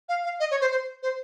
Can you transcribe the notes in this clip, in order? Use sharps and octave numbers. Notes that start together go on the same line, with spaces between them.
F5
F5
D#5
C#5
C5
C5
C5